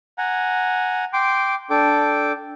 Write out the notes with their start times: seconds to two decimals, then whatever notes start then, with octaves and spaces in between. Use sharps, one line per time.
0.18 F#5 G#5 A#5
1.13 G5 C6 D6
1.70 D4 A4 G5 D6